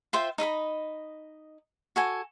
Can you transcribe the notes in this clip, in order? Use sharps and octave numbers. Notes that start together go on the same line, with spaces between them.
F4 C5 E5 G5
D#4 D#5 E5 B5
F#4 A4 G#5